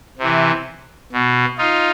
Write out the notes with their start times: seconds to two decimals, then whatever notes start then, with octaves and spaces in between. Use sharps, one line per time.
0.19 C3 E3
1.12 B2
1.58 D#4 F4